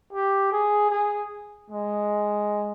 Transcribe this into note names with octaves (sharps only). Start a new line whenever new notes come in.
G4
G#4
G#4
G#3